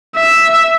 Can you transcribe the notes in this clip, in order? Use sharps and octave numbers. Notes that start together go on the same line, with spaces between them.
E5